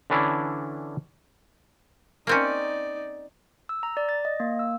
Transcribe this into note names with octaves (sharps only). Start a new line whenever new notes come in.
D3 E3 C#4 D4 E4
A#3 C4 C#4 D#4 D5
E6
A#5
D5
A6
D#5
A#3
E6